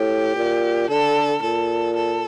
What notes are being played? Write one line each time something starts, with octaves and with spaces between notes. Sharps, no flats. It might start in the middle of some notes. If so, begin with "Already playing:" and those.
Already playing: A2 G4
A#2
D3 A4
A#2 A4
A4